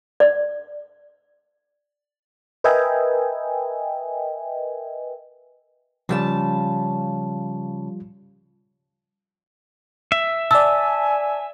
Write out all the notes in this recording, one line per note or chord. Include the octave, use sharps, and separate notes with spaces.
D5
A#4 B4 D#5 E5 G5 G#5
C#3 F3 G3 F4 G#5 A5
E5
D5 G#5 A5 E6